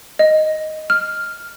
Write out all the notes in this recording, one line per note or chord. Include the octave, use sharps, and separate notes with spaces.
D#5
F6